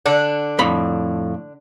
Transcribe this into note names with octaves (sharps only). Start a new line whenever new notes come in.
D3 D4 F#5
F2 A2 B5